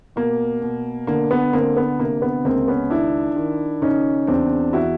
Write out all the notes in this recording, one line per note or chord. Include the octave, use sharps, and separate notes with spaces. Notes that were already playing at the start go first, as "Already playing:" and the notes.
B2 A#3
B2
D3 A#3
B3
D3 A#3 C4
B3
C3 A#3
B3
C#2 A#3 C4
B3 C#4
D#3 D4 E4
D#3
C#3 C#4 D#4
E2 C4 D4
E3 E4 F#4